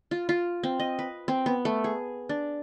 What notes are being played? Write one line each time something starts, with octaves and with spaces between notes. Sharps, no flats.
F4
F4
C4
D#5
B4
C4
B3
A3
G#4
D4